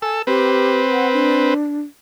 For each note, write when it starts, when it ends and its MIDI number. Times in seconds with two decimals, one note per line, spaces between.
0.02 0.22 69
0.02 0.19 80
0.02 0.22 88
0.27 1.54 60
0.27 0.79 67
0.27 1.54 71
0.92 1.07 78
1.13 1.81 62